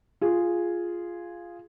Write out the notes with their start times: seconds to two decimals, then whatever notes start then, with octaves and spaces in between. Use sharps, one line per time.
0.21 F4 G#4